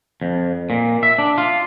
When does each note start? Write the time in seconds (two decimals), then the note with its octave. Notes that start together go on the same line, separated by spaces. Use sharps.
0.22 F2
0.70 A#2
1.03 E5
1.18 D4
1.38 F4